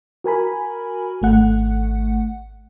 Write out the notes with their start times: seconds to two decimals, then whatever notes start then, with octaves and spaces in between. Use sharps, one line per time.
0.24 F#4 A#4 G#5 B5
1.22 G#1 A3 F#5